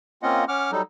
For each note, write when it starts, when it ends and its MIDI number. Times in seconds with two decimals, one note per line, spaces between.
0.23 0.45 58
0.23 0.45 60
0.23 0.45 61
0.23 0.45 65
0.23 0.45 75
0.23 0.45 78
0.48 0.71 61
0.48 0.71 78
0.48 0.71 86
0.48 0.71 89
0.72 0.82 54
0.72 0.82 55
0.72 0.82 63
0.72 0.82 69